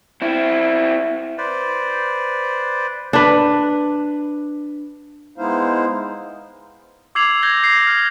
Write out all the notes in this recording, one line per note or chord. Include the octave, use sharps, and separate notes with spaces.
C4 E4
B4 C5 D5
D4 B4
G#3 B3 D#4 E4 C5 F5
D6 E6 G#6 C7 F7 F#7
G6 G#6 A#6 G7
A#6 C7
F6